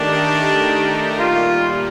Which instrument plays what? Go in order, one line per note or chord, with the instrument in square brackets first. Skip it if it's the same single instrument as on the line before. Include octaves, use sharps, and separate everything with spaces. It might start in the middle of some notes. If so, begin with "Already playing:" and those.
Already playing: [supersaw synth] D#3 A3 D#4 G4 A#4 [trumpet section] D4
[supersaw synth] A#2 G3 A#3 [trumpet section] F4